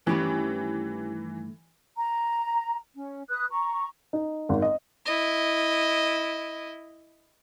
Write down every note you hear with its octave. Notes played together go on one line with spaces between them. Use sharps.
G2 D#3 E3 A3 C#4 G4 B4
A#5
C#4
B4 D#6 F#6
A#5 C#6
D#4
G#1
D#5
E4 D#5